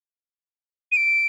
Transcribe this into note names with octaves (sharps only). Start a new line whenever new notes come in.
D#7
D7